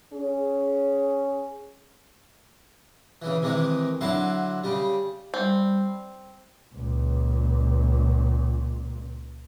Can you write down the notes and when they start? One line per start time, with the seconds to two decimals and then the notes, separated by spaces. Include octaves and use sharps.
0.13 C#4 G#4
3.22 C#3 E3
3.42 C3 D#3 E3 G#3
4.01 D3 F#3 E4 A5 C6
4.64 C#3 G3
5.34 G3 C4
6.74 C#2 A#2